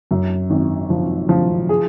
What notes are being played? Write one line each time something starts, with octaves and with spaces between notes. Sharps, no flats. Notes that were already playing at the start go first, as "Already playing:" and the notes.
F#2
G#1
F3
F3
G#4